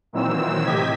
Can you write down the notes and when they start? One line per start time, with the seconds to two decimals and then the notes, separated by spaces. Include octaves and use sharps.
0.13 A#2 D#3 E3 F#3 C4 E6
0.65 A2 C3 G4 D#5 G#6 B6